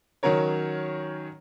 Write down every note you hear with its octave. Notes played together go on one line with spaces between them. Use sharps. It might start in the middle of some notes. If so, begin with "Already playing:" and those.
D#3 F#3 C#4 A#4 C#5